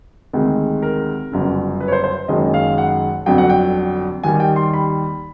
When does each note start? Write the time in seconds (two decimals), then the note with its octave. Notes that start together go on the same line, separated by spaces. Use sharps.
0.33 D2 C3 D#3 G#3
0.83 A#4
1.32 G1 F#2 C#3
1.81 B4
1.88 C#5
1.92 C5
2.04 C5
2.28 F#1 F#2 D#3 G#3 D#5
2.54 F5
2.78 F#5
3.26 G1 F2 D3 F#3 G5
3.38 F#5
3.50 G5
4.23 D#2 D#3 G3 G#5
4.40 G5
4.56 C6
4.74 B5